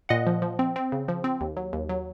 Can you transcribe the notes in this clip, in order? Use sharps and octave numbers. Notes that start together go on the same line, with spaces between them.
A#2 D#5 F#5
F3
F3
C4
C4
C#3
F3
C4
D#2
F#3
D#2
F#3